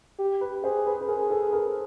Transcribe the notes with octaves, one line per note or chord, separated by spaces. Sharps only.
G4
B4
G#4 C5
B4
B4
G#4 A#4
A4
A#4